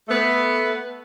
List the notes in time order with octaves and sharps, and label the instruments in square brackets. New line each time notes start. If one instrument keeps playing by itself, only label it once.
[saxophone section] A3 B3